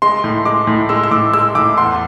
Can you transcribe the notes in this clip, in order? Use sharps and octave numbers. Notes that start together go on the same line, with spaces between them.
G#3 C6
A2
G#3 D6
A2
G#3 E6
E6
A2 D6
G#3 E6
A2 D6
E2 C6